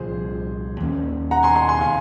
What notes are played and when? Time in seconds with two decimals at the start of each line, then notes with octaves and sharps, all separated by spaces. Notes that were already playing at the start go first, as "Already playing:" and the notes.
Already playing: C2 A#2 F3 G#4 C5
0.80 D#2 D#3 A#3 C#4
1.31 F#5 A#5
1.43 G#5 C6
1.56 G#5 C6
1.69 G#5 C6
1.81 C3 D#3 F5 G#5